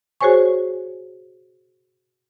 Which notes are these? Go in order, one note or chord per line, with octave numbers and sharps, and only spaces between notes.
F#4 G#4 C5 C#5 G#5 C#6